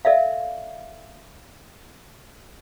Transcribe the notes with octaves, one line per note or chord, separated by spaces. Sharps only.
A4 D5 E5 F5